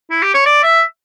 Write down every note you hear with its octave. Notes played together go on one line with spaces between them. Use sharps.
E4
G4
C#5
D5
E5